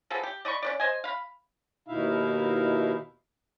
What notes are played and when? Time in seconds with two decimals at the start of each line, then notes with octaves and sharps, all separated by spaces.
0.10 F3 B3 G#4 A4
0.23 G4
0.45 D5 D#5 B5 C#6
0.62 C#4 B4 D5
0.80 C5 D#5 G#5
1.04 F5 B5
1.87 D#2 B2 D#4 E4 E5 F5